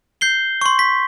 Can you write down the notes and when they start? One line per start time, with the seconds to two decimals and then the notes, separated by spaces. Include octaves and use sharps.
0.21 G6 C7 G7
0.61 C6 C#6
0.79 B6